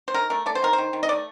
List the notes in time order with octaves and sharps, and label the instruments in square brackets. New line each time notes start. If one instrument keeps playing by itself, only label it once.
[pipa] C5
D#3 A#4
A3 A#4
A3 D5
C5
D#3 A#4
C5
D#3
D#3
D#5
A3 D5